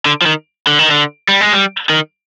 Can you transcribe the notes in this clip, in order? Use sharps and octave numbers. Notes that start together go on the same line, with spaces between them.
D3
F3
D#3
D3
D#3
D3
G3
G#3
G3
D#3